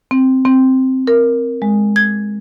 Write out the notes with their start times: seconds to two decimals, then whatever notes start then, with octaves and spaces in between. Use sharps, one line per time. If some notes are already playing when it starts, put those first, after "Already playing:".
0.11 C4
0.45 C4
1.07 A#4
1.62 G#3
1.96 G#6